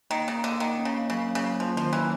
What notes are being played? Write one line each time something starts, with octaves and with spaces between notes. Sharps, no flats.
D#3 A#3
C#3 A#3
D3 A#3
D#3 A#3
C#4
C#3
A#3
C#3 F#3
C#4
C#3
F#3
F3 A#3
D#3 F3
E3 F#3